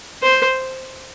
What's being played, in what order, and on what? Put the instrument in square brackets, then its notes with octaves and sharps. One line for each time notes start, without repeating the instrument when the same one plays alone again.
[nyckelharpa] C5